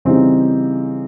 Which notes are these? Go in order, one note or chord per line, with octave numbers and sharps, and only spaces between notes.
C#3 E3 G3 C4 D#4